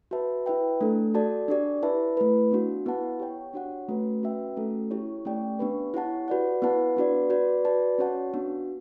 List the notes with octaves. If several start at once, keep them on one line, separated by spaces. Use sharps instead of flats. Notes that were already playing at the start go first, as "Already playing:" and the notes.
F#4 B4 E5 A5
E4 B4 E5 G5
A3 D4 A4
F#4 A4 D5 A5
D4 G4 D5
E4 B4 E5 A5
A3 E4 B4
B3 D4 F#4
B3 E4 B4 F#5 A5
G4 C#5 G5
D4 F#4 C#5 F#5
A3 C#4 F#4 B4
C#4 F#4 B4 E5 G5
A3 C#4 F#4 A4
E4 G4 C#5
A3 C#4 G4 D5 G5
B3 D4 G4 B4
E4 G4 C#5 F#5 A5
F#4 B4 D5 F#5
B3 E4 B4 F#5 A5
B3 D4 F#4 B4 D5
F#4 B4 D5
F#4 B4 D5 A5
C#4 F#4 C#5 F#5 A5
B3 D4 F#4